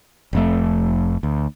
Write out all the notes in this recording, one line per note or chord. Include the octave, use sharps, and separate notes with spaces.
F1 F2 A3
D2